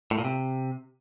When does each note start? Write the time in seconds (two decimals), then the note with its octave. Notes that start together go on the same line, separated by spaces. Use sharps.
0.11 A2
0.18 A#2
0.25 C3